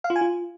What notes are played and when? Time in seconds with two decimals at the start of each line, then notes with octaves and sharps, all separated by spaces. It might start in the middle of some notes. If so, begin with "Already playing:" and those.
0.04 F5
0.10 F4
0.16 G#5
0.21 F4